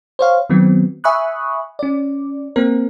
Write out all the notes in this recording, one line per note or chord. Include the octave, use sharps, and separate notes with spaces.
C5 C#5 F5
D#3 F#3 B3 C4
E5 G#5 B5 C#6 D#6 F#6
C#4 D5
A#3 C4 A#4